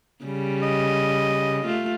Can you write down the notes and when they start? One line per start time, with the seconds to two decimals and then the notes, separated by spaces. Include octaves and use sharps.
0.24 C#3 G3
0.62 D#5
1.66 A3 F4